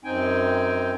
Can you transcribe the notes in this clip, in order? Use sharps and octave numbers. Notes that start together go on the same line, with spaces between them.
F#2 C4 D#4 G5 G#5